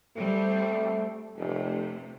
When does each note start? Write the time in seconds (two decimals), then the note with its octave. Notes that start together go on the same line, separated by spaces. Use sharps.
0.17 G3 A3 C4
1.37 F1 C3 A3